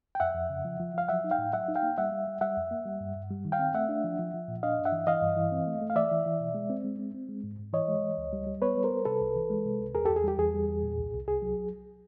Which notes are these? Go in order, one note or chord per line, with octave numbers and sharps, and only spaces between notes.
G5
F2 E5 F#5
F2
C#3
F3
F3
F3 F5
F#3 E5 F#5
D#4
F5 G5
A2
F#3 E5 F#5
D#4
F5 G5
A#3
G3 E5 F#5
G3
G3
G3 E5 F#5
F2
A#3
G3
G2
G2
G3
D#3
F5 G5
C4
A3 E5 F#5
D4
F3
F3
F3
A#2
D4 D#5 F5
G2
E5 F#5
E3
E3 D#5 F5
G2
E3
C4
A3
A3
F5
E3 D5 E5
E3
E3
B2
G#3
C4
G#3
C4
C4
G#3
G#2
G#2
E3 C#5 D#5
G#3
E3
C#2
G3
G3
B3 B4 C#5
G3
A#4 C5
G3
C3 A4 B4
C2
E3
G#3
C3
C2
E2 G#4 A#4
E2 G4 A4
G#4
G3 G4
E2 G#4
G3
E2
A#2
C2
C2
C2 G#4
F#3